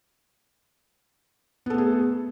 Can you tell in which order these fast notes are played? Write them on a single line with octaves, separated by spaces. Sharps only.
B3 A4 A3 G#4